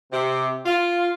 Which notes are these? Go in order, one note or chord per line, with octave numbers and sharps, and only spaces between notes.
C3
F4